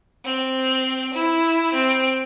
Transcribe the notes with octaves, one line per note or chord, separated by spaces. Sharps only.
C4
E4
C4